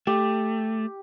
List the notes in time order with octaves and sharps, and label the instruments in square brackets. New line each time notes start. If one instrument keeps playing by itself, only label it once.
[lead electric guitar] A3 [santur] G4